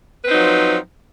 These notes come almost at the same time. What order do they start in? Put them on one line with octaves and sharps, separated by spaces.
B4 C4 D#4 F#3 F3